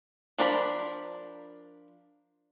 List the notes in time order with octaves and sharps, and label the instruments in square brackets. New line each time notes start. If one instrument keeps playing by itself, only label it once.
[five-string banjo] F3 D4 A#4 A#5 B5